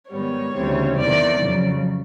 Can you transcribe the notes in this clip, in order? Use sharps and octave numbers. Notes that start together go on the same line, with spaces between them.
G#2 D#3 G3 B3 C#5
D2 C#3 E3 G3 C4
E2 C3 D#3 D5
F2 C#3 F#3